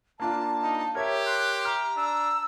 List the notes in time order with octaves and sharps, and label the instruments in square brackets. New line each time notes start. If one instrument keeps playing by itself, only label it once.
[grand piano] A#3 D4 F4 [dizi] A5
[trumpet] D#4
[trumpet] G4 [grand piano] A#4 C#5 E5 [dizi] G#6
[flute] C6 [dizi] F#6
[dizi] A#5 [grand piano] F6
[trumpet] D4 [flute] E6